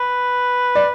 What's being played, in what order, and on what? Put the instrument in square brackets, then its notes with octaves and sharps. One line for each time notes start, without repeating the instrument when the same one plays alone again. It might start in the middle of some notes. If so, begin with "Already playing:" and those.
Already playing: [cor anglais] B4
[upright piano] D5